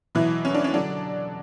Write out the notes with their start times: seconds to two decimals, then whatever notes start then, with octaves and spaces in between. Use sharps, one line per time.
0.15 B2 E3 F#3 E4
0.45 C#4
0.55 D4
0.64 C#4
0.74 D3 F#3 D4